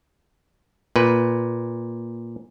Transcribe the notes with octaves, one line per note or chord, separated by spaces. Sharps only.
A#2 B4